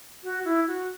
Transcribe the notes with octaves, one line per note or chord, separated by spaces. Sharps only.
F#4
E4
F#4